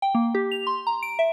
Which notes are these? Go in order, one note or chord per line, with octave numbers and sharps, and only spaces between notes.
G5
A#3
G4
F7
C6
A#5
D7
E5